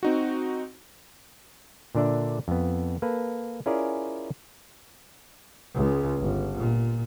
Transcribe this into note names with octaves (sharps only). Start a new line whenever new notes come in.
C4 D#4 F#4
A#2 D3 D4 D5 E5
F2 B3
A#3 A4 B4
C#4 E4 F4 G#4 A#4 D5
C#2 G#3
G1
A#2